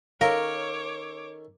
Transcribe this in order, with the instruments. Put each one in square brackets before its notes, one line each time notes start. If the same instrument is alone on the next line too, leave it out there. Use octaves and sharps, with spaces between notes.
[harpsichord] D#3 C#4 A4 [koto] A#4 [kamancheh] C#5 D6 [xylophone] F5